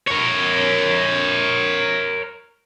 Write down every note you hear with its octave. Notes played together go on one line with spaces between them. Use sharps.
A#4 C#5